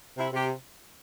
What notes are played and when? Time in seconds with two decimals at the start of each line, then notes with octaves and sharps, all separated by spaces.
0.17 C3 E4
0.33 C3 G4